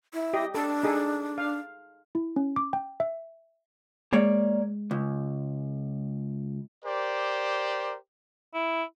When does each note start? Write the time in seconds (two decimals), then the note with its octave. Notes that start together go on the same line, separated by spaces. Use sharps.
0.14 E4
0.33 G4 D#5
0.55 D4 A4
0.83 D#4 G#4 A4
1.38 F5
2.15 E4
2.36 C#4
2.56 D6
2.73 G5
3.00 E5
4.13 G#3 A#3 C#5 D5
4.91 C#2
6.85 G4 A#4 C5 D5
8.54 E4